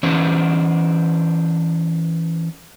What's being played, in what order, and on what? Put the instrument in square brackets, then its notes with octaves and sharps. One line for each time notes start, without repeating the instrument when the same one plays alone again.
[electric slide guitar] E3 C#4 D4 C5